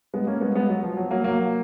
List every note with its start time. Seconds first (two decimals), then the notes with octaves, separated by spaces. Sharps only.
0.14 G#3 B3
0.27 A#3 C#4
0.41 G#3 B3
0.55 G#3 B3
0.69 F#3
0.83 F3
0.97 F#3
1.11 F#3 A#3
1.24 F#3 A#3